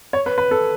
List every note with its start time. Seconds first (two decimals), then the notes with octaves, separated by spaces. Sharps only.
0.13 C#5
0.26 B4
0.38 B4
0.51 A4